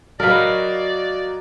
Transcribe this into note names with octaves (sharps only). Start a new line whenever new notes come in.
F#3 A#3 F#4 A#4 B4 D5 D#5